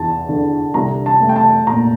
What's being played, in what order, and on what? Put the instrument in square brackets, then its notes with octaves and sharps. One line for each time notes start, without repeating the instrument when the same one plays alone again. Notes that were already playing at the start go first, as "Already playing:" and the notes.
Already playing: [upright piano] E2 [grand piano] A5
[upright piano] D3
[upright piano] C2 [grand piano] A#5
[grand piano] A5
[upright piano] A3
[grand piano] G5
A5
[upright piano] A#2 [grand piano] A#5